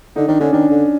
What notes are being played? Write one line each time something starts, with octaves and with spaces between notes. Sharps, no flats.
D3 D#4
D#3 D4
D3 C#4
D#3 D4
D3